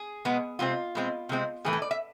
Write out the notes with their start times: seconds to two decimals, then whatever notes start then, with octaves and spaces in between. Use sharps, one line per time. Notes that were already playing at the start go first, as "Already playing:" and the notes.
Already playing: G#4
0.25 B2 G#3 B3
0.59 C3 G#3 C4 F4
0.95 B2 G#3 C4
1.29 C3 G#3 C4
1.65 A2 E3 A3 G#4
1.73 A4
1.82 D5
1.91 E5